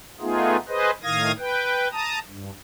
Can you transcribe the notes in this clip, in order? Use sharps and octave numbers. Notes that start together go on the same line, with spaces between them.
A3 B3 D#4 F4 G#4
G#4 B4 C5 D#5
A2 D#3 F5 D#6 G#6 A#6
B4 G5
A5 A#5 D#6
G2